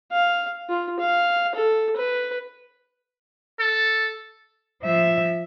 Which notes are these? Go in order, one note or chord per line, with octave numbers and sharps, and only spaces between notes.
F5
F4
F5
A4
B4
A4
F3 E5